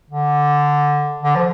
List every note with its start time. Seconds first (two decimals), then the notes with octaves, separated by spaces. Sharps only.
0.10 D3
1.23 D3
1.36 F3